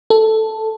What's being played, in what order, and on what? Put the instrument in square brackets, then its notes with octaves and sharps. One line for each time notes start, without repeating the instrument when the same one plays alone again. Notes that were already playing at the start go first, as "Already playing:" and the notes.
[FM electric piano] A4